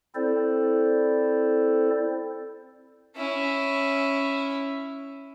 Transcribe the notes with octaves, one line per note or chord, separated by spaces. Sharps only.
C4 E4 A4 C5 D5
C#4 E4